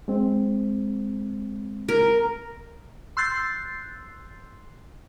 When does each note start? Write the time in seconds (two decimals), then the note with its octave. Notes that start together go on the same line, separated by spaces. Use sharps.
0.08 G#3 C4
1.89 A#4
3.17 C6 E6 F#6 G6 A6 C7